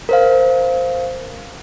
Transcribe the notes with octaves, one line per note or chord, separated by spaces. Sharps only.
A#4 C5 F5